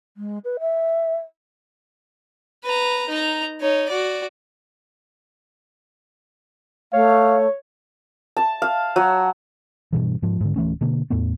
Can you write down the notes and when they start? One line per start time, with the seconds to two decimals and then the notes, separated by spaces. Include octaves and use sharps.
0.17 G#3
0.44 B4
0.60 E5
2.64 B4 A#5
3.09 D#4 A#5
3.61 D#4 C#5
3.89 F#4 D5
6.93 A3 C#5 F5
8.37 A5
8.62 F5
8.96 F#3
9.93 G2 B2 E3
10.22 G#2 F3
10.40 G#2 D3
10.56 D1 E3 A3 C#4
10.81 B2 D3 A#3
11.10 E2 A2 A3 B3